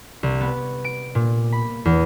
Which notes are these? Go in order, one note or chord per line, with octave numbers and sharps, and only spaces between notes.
C2
B3
D7
A#2
B5
E2